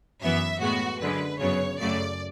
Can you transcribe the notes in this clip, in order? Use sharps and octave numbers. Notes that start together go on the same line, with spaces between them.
F#2 E3 B3 E5
A2 G#3 B3 F#4
F#2 D3 G#3 B4
F#2 C#3 F#3 B3 C#5
F#2 C#3 F#3 A3 D5